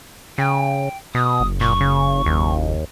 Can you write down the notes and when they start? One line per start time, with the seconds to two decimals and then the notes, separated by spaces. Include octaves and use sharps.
0.38 C#3 G5
1.15 B2 D#6
1.40 F#1
1.61 A#2 C#6
1.81 C#3
2.26 D#2